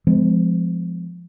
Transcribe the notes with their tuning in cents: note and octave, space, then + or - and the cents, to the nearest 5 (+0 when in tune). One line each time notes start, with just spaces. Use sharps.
F3 +0 G#3 +0 C4 -45